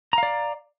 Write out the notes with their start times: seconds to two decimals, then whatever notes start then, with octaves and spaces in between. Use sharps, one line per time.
0.13 A#5
0.18 F5
0.23 D5